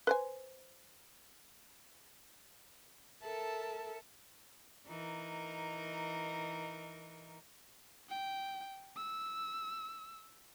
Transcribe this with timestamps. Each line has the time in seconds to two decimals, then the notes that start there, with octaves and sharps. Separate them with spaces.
0.07 B4 C5 G#5
3.21 A4 A#4 E5 A5
4.87 E3 D#4 A#4
8.10 G5
8.97 E6